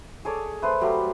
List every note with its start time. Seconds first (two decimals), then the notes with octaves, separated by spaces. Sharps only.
0.25 G#4 A4 C#5 D5
0.62 A3 B4 C5
0.81 F#3 G3 A3